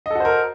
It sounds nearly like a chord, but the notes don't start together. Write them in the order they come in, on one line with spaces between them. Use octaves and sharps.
D#5 A4 F#4 C5 A#4